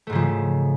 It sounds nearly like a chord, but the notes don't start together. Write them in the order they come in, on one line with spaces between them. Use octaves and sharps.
A3 G#2 C#3 F3